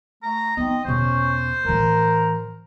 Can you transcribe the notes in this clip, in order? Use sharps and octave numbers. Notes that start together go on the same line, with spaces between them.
A3 A#5
B3 C4 D#4 D#5
E2 B2 C#4 C5
A2 E3 A#4